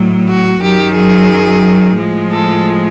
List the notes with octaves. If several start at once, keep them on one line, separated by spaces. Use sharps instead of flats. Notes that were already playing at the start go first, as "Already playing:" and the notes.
Already playing: A2 F#3
F#4
F#2 D#3 F#3 G4
G#4
A2 F3 G#3
A4